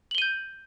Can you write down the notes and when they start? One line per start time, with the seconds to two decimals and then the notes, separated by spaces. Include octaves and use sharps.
0.11 F#7
0.15 G7
0.18 D#7
0.22 G6